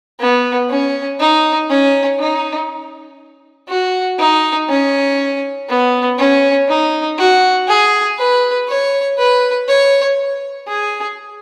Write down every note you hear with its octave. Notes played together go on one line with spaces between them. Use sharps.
B3
C#4
D#4
C#4
D#4
F#4
D#4
C#4
B3
C#4
D#4
F#4
G#4
B4
C#5
B4
C#5
G#4